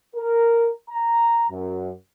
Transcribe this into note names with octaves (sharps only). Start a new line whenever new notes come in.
A#4
A#5
F#2